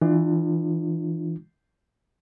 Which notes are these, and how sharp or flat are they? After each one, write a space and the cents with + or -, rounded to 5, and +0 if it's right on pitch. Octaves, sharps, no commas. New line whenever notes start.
E3 +0 D4 +35 F4 -10